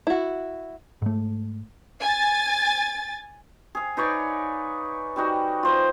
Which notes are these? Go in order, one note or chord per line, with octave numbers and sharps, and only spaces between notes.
E4 F#4
G#2 A3
G#5 A6
G#4 F5
D#4 B4 C#5 D5
G3 D#4 F#4
F4 C5 D#5